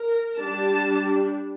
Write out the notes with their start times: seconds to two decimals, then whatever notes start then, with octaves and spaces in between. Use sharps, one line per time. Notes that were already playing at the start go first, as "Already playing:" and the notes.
Already playing: A#4
0.38 G3 D4 A5